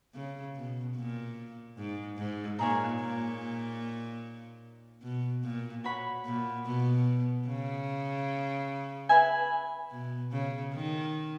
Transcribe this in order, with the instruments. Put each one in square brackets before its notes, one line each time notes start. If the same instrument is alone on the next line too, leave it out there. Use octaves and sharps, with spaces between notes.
[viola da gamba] C#3
B2
A#2
G#2
G#2
[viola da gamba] A#2 [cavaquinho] D#4 G#4 C#5
[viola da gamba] A#2
B2
A#2
[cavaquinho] F#4 C#5 F#5 B5
[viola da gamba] A#2
B2
C#3
[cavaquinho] B4 E5 G#5
[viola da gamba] B2
C#3
D#3